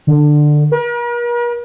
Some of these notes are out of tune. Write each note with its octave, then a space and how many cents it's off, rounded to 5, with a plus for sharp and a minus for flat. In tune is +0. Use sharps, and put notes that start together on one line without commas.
D3 +15
A#4 +45